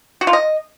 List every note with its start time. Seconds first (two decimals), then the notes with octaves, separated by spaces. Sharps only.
0.21 F#4
0.27 F4
0.33 D#5